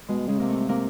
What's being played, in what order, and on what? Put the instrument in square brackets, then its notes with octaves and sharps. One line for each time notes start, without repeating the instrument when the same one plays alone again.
[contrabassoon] B2 [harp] G#3
[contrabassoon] C#3 [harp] G#3
[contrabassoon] C3 [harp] A#3
[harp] A3
[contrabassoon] C3 [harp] A#3